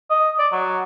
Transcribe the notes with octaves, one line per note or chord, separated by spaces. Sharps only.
D#5
D5
F#3